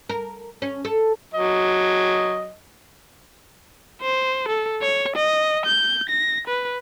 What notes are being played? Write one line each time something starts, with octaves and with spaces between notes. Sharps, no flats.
A#4
C#4
A4
F#3 D#5
C5
A4
C#5
D#5
G6
A#6
B4